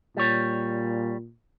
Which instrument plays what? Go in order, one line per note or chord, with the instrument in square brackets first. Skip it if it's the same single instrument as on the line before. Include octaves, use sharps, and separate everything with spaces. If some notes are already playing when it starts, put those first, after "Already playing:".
[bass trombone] A#2 [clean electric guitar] G3 C#5